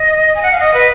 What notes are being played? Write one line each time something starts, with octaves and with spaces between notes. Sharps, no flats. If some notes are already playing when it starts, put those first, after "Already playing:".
Already playing: D#5
G#5
F#5
F5
D#5
B4